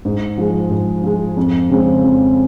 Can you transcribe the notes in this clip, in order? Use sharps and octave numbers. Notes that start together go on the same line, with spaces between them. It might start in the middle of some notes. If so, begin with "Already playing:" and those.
G#2
F3 G#3
G#2
F3 G#3
F2
C#3 G#3 C4
F2